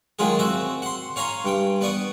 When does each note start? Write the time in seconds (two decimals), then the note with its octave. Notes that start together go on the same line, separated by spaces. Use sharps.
0.19 D#3 F#3 G#3 F4 G#4
0.39 C4 F#4 E5
0.82 F#5 C6
1.16 C#5 F5 G#5 A#5 C6
1.44 G2 G5
1.81 B3 D5 C#6 D#6